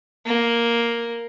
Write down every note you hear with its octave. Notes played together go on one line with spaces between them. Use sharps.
A#3